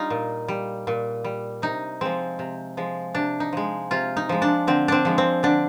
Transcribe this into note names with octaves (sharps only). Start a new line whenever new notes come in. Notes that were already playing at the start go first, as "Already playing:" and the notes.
Already playing: G3 D#4 F4
A#2
G3
A#2
G3
C3 D#4
F3 G#3 C4
C3
F3 G#3
C3 D4
D#4
F3 G#3
C3 F4
D#4
F3 G#3
D4
D3 C4
C4 D4
F3 G#3
C4
D3 D4